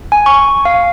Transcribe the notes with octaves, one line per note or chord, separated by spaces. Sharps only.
G#5
C#6
F5